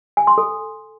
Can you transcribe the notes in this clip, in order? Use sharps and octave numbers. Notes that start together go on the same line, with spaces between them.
G#5
C6
A4